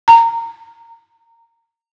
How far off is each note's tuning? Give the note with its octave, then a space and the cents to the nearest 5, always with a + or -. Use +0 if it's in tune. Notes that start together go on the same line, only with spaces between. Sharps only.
A#5 -15